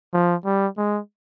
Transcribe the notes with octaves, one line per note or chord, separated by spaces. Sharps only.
F3
G3
G#3